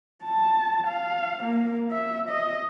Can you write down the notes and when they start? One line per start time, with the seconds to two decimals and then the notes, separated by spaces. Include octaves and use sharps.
0.25 A5
0.87 F5
1.43 A#3
1.91 E5
2.29 D#5